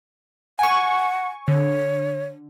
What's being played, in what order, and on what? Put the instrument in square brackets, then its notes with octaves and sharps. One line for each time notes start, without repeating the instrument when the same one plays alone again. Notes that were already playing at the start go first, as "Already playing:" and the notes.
[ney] F#5 [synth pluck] G#5 C#6
[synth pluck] D3 [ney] C#5